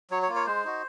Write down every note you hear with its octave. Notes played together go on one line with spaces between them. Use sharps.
F#3 C#5
C#5
A#3 F4
C#5
G#3 C5
D#4 F#4